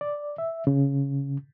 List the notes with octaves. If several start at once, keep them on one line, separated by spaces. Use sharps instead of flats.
D5
E5
C#3